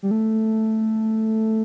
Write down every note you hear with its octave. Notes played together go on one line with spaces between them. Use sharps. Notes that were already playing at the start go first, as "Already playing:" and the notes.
G3
A3